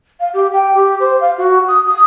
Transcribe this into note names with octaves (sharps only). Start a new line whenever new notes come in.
F5
G4
G5
G4
C5
F5
F#4
D#6
D#6